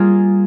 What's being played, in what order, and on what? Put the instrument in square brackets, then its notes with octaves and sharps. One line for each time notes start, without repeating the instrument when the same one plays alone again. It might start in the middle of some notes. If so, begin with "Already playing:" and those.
Already playing: [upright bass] G3 [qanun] A#3 F4 G#4